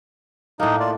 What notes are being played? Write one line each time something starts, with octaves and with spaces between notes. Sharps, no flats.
A2 A#3 D#4
F4 D5